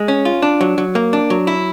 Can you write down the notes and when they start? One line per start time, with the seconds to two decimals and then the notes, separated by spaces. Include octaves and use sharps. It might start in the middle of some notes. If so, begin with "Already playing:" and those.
Already playing: G#3
0.08 C#4
0.25 F4
0.42 D4
0.61 F#3
0.78 F#3
0.95 A#3
1.13 D4
1.30 F#3
1.47 E4